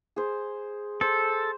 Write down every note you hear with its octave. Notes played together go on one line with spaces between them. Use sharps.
G#4 C5
A4 C5